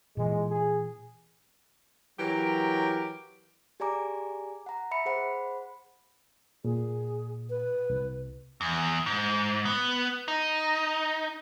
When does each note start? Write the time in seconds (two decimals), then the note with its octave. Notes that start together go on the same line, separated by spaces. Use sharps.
0.17 A#2 E3 G#3
0.49 G#4
2.19 E3 F#3 G4 A#4
3.80 G4 G#4 D5 G#5 A#5 D6
4.66 F#5 A#5
4.91 E5 B5 C#7
5.06 G#4 C5 F#5 B5
6.64 A#2 G#4
7.50 B4
7.90 C2
8.61 E2
9.06 G#2
9.65 B3
10.28 D#4